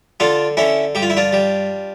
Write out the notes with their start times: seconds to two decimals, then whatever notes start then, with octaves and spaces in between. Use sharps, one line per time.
0.20 D3 D4 F4
0.57 D3 C#4 E4
0.95 G2 G4
1.02 F4
1.10 E4
1.17 D4 F4
1.33 G3